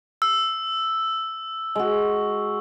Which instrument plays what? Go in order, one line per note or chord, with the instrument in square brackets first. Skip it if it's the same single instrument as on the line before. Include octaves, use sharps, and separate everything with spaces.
[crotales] E6
[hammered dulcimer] G#3 F#4